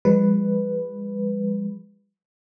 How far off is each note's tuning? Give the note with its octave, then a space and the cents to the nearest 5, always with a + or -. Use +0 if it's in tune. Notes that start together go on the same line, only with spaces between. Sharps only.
F3 +0 G#3 -40 B4 +0